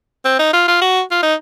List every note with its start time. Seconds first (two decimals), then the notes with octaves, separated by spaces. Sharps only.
0.25 C4
0.39 D#4
0.53 F4
0.68 F4
0.82 F#4
1.11 F4
1.23 D#4